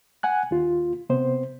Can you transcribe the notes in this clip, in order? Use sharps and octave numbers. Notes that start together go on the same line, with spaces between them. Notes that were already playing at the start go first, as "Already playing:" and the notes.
F#5 G#5 F#6
D#2 F4
C3 B3 C5